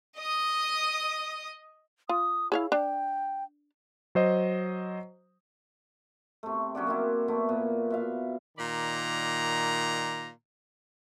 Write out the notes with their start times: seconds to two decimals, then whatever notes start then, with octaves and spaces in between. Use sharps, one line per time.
0.18 D#5 D#6
2.09 F4 D#6
2.52 E4 G#4 C#5 F5
2.72 D4 G5
4.15 F#3 C5 D#5
6.43 C3 A3
6.75 F#3 C#4 F#4 D5
6.87 A#3 C4 E4
7.28 A3 B3 E4
7.49 A#2
7.90 B2 E5 F5
8.58 A#2 D#3 D5 A#5